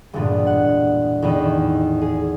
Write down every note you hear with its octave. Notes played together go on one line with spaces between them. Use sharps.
E1 G2 A#2 D3 B3
F#5
E2 A2 D#3 B3 G5 E7
G#4